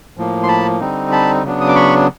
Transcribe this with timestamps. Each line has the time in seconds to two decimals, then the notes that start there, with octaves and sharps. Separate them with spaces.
0.17 A2 F3 A#3
0.43 C6
0.48 A5 B5
0.80 D3 G3 C4 D#4
1.12 A5 B5
1.44 C#3 F#3 B3 D4
1.61 D#6
1.68 D6
1.75 B5 C#6